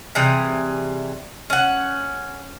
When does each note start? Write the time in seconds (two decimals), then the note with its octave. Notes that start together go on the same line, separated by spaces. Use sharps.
0.15 C3 E3 G3 G#4
1.50 C#4 F#5